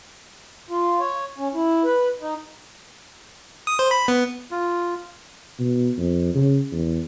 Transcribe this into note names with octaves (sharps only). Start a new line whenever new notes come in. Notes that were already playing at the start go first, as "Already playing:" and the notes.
F4
C#5
C#4
E4
B4
D#4
D#6
C5
B5
B3
F4
B2
F2
C#3
E2